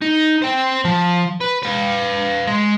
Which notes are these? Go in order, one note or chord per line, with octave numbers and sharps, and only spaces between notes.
D#4
C5 G5
F3
B4
B4 F5
G#3